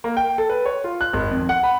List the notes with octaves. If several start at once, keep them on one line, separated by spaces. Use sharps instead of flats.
A#3
G5
A4
B4
C#5
F4
F#6
G#1
F2
F#5
B5